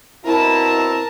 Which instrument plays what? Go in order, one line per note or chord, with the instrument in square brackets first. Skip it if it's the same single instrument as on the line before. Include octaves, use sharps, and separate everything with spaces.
[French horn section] B2 C4 E4 [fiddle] A#4 A5